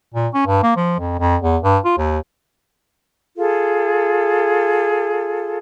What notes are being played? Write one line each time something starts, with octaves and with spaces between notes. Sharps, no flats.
A#2
C#4
G2
A#3
F3
F2
F2
E2
G2
F4
D#2
F4 G#4 A4